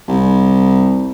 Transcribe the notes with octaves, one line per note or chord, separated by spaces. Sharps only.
C2